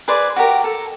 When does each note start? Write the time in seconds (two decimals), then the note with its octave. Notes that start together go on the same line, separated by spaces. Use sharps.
0.08 G#4 B4 C5 D5
0.36 F#4 G4 A#4
0.64 A4